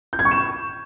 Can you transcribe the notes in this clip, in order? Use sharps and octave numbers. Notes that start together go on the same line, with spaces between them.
G6
G#6
C#6
E7